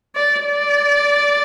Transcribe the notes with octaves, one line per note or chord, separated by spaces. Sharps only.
D5
D5